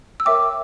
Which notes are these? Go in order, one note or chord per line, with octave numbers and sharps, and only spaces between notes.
E6
A#4 C#5 E5 G5 D6